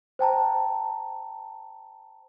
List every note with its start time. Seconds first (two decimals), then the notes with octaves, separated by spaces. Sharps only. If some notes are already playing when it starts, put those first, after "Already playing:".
0.19 C5 G5 A5 A#5